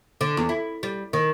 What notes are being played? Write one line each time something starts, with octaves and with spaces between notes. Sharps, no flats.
D3
E2
E4
G3
D#3